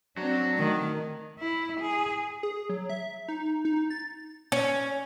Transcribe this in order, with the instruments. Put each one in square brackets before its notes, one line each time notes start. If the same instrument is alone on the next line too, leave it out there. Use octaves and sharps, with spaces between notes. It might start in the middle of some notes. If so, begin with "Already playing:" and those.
[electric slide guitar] F#3 [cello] C4 D4
[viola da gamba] D#3 [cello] A3
[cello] E4
G#4
[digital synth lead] G#4
F#3
E5
D#4
D#4
A6
[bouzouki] C#4